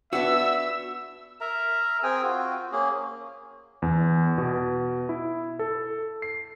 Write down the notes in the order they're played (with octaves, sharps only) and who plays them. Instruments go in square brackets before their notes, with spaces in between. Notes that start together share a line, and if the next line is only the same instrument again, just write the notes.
[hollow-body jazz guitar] B3 D4 F#4 [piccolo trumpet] E5 [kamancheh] E6
[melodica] A#4 E5 A#5
C4 G#4 G5 G#5
C4 F4 F#4
A#3 C#4 G#4
[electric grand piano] E2
B2
E4
A4
C7